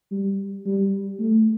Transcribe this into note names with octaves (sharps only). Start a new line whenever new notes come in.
G3
G3
A3